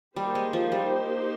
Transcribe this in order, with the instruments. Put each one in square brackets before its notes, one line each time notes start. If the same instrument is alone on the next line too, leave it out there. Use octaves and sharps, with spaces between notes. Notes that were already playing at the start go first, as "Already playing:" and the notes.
[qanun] G3 [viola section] A#3 D#4 G4 C5
[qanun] G#3
F3
G3